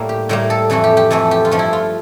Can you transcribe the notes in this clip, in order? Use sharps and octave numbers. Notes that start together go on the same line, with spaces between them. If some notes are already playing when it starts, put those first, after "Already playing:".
Already playing: A2 G3 A#3
G4
A2 G3 A#3 A#4
A4
F2 E3 A3 A4
G4
G4
F2 E3 A3 A4
G4
F4
G2 F3 A3
E4
F4